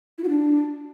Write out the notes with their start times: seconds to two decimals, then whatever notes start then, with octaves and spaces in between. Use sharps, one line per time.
0.18 E4
0.24 F#4
0.29 D4